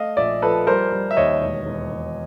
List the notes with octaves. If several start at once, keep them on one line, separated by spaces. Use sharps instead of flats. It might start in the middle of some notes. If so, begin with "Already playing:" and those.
Already playing: A3 D#5 F5
A#1 D5 E5
F3 A4 B4
G3 A#4 C5
G3
E5
D#2 C#5 D#5
E1
E1
E1